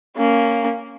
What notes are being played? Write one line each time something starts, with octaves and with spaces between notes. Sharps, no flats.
A#3 C#4